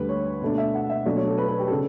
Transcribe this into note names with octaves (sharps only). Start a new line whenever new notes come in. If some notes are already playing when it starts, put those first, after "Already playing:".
Already playing: D2 D3 G3 B4
C#5
B2 A3 D4
E5
F#5
E5
B2 F#3 A3 D4 D5
C#5
A4
B4
B4
G4
A4
C#3